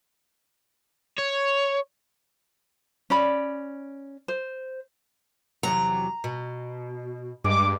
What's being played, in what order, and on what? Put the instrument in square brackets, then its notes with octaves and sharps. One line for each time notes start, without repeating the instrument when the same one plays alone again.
[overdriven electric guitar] C#5
[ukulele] C#4 D5 B5
C5
[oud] E2 C3 F#3 [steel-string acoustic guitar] A#5
[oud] B2
[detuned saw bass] G2 [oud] G#3 [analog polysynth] D6